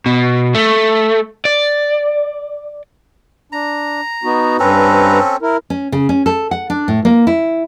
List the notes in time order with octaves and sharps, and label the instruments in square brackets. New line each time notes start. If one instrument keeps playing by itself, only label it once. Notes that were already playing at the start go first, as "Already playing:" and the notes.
[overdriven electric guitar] B2
A3
D5
[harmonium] D4 [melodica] A#5
[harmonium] B3 D#4 F#4
[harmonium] G2 B4 A#5 [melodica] C4 C#4 A4
[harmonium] E4 A#4
[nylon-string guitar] C#4
C#3
C#4
A4
F#5
D4
A2
A#3
E4